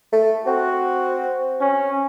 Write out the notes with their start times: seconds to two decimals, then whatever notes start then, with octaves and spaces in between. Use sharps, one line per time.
0.12 A3
0.46 C4 F#4
1.61 C#4